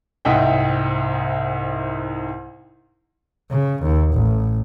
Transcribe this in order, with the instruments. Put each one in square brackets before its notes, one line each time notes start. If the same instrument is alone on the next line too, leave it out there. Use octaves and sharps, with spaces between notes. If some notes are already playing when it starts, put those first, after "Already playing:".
[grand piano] C2 G#2 D#5 E5 F#5 G5
[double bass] C#3
D#2
A1